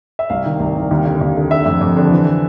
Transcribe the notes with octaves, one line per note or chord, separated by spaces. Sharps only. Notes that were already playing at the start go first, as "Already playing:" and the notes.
E5
C2 F5
D#3
C2
C2
D#2
D3
D#2
D3
D3 E5
F2
F2
D3
E3